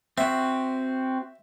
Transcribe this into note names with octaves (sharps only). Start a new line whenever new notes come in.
C4 F#4 E5